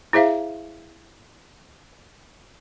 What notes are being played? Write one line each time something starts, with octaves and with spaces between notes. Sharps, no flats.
E4 G#4 C5 E5 F5